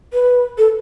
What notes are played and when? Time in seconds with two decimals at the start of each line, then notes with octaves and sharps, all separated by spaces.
0.13 B4
0.58 A4